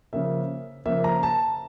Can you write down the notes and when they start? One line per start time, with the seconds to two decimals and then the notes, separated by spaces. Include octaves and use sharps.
0.13 C#3 F3 A#3 E5
0.86 C#3 F3 A#3 E5
1.04 A#5
1.23 A5